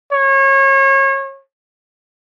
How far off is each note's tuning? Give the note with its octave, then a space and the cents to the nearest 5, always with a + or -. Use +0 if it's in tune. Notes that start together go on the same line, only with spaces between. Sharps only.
C#5 -30